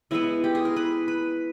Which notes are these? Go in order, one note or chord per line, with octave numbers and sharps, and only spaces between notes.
E3 G#3 B3 E4
G4
G#4
A#4
B4
B4